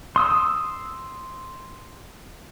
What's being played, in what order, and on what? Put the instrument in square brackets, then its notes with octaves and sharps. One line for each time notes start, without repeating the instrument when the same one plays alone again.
[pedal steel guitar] C6 D#6 E6